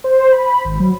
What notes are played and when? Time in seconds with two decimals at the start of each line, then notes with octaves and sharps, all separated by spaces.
0.04 C5
0.32 B5
0.65 G#1
0.80 F#3